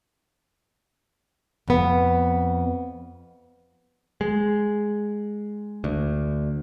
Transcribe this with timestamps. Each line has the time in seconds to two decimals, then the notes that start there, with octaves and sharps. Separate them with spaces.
1.68 F2 B3
4.21 G#3
5.84 D2